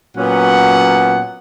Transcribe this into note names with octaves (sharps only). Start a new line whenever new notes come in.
A#2 F#3 B3 C#4 F#5